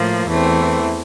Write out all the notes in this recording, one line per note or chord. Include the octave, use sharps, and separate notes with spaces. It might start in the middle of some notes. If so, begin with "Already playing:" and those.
Already playing: A2 F3 A#3
E2 E3 A3 C4